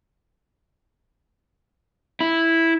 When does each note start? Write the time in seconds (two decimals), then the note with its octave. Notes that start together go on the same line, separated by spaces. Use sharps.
2.21 E4